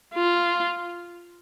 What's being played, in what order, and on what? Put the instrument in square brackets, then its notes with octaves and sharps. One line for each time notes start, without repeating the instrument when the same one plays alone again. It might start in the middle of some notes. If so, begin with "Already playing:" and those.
[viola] F4